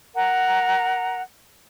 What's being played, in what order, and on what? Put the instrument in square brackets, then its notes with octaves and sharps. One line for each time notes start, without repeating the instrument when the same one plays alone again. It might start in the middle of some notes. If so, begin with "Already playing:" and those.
[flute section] A#4 F#5 A#5